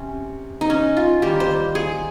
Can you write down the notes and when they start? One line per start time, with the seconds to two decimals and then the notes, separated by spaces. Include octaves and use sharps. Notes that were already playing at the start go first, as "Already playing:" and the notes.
Already playing: C3 C#4
0.61 D#4
0.70 C#4
0.97 F4
1.22 D#3 G3 A#3 G4
1.40 C5
1.75 G#4